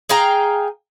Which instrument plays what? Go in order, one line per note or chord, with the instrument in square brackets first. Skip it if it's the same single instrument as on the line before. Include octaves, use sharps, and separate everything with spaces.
[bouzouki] G#4 F5 G5 A#5